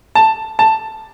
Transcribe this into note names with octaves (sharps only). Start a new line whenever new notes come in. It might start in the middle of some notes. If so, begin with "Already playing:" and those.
A5
A5